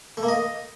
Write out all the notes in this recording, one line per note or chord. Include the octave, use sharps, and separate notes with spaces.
A3
A#3
D#5